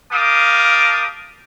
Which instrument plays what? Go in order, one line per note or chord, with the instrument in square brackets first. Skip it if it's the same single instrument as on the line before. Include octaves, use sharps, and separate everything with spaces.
[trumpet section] G4 A#4 F5 A5 D6 D#6